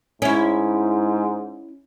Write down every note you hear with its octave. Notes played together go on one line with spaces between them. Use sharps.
G#2 C#4 E4